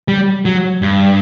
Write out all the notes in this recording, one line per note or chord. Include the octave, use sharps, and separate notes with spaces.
G3
F#3
G2